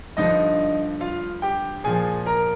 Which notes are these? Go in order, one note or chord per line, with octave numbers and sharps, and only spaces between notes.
G2 D3 F3 D#4 D#5
F4 F5
G4 G5
A#2 F3 G#4 G#5
A#4 A#5